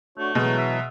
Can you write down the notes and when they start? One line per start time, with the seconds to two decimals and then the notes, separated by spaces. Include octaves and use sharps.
0.18 A3 D4 F#4 C#5
0.35 B2 E3 F#3 G#3
0.58 E5